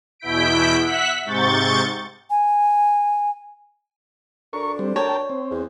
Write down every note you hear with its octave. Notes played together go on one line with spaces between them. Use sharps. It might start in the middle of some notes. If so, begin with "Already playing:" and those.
E2 B2 E4 G6 B6 D7
E5 F#5 F#6 B6
G#2 C3 C#6 G6 A6
G#5
D2 A3 D4 A#4 C#6
G3 C4
A#4 C#5 G5 A5
C4
E2